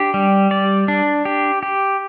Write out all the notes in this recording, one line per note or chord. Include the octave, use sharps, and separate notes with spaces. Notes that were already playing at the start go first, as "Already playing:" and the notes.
Already playing: D4 G4
G3
D5
D4
G4
G4